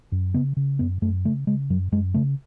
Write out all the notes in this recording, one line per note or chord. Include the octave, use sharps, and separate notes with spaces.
F#2
C#3 B3
C#3
F#2 B3
F#2 A3
C#3 A3
C#3 G#3
F#2 F#3
F#2 G#3
C#3 A3